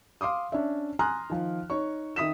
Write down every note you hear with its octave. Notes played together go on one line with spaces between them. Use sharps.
F5 C6 D6 D#6
C#4 D4 C#5 D5 E5
G#5 A#5 C6 D#6 F6 F#6
D#3 F3
D#4 C#5 C#6
D#3 E5 D#6 B6 E7